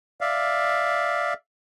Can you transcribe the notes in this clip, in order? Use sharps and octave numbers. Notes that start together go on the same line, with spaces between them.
D5 E5 F5